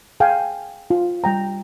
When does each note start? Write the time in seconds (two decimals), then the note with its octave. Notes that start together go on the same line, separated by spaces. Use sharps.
0.20 G#4 F5 G5 G#5
0.90 F4
1.24 G3 G5 A#5